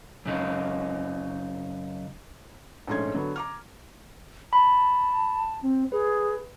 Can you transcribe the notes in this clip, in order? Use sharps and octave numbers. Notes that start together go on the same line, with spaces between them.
F#2 C#3 D#4
A#1 G#2 A3 C#4 C6 G#6
D3 F#3 B3
A#5 D6 F6
A5 B5
C4
G#4 B4